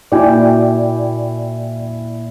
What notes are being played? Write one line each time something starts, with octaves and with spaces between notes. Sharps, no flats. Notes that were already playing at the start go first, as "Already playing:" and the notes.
A#2 E4 F#4 D5 G5 G#5